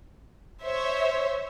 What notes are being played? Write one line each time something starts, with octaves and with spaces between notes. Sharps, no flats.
C5 C#5 E5